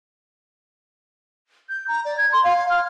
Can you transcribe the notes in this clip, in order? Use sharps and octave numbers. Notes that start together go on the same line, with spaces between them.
G6
A#5
D5
G#6
C6
F5
F6